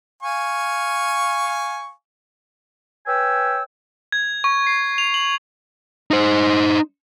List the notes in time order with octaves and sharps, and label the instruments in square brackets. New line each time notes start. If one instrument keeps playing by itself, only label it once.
[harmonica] F5 G#5 C#6
[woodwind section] B4 C#5 G5 G#5 E6
[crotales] G#6
C#6
C7
F7
F#7
[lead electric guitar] D#4 C5